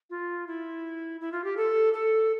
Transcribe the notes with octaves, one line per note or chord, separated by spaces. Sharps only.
F4
E4
E4
F4
G4
A4
A4